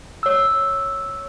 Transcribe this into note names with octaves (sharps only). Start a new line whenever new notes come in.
C#5 E6